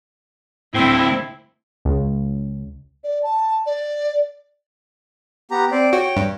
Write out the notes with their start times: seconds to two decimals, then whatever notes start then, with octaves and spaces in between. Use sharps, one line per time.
0.74 D2 A2 C4 E4
1.85 C#2
3.04 D5
3.23 A5
3.66 D5
5.51 B3 G4 A#5
5.72 C4 C5 D5
5.93 F#4 C#5 G5
6.17 G2